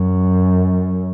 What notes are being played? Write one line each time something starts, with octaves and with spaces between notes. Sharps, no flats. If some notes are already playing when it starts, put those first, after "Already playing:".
Already playing: F#2